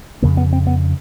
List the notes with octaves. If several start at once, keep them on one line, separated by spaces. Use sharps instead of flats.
F2 C#3 A#3
B3
C4
B3